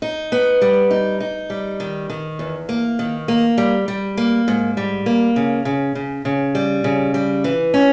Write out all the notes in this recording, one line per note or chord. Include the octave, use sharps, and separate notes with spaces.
D#4
B3
G3
D#4
D#4
G3
D#3
D#3
E2
A#3
D#3
A#3
G3
G3
A#3
G#2
G3
A#3
C#3
C#3
C#3
C#3
G3
C#3
G3
E3
C#4